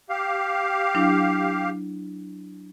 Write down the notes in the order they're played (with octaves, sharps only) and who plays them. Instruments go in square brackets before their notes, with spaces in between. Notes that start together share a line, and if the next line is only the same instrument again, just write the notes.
[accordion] G4 F5
[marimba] F#3 D4 E4